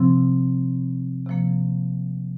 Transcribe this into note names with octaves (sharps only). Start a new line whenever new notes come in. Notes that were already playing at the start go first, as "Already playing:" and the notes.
Already playing: C3 F3 C4
C3 F3 A#3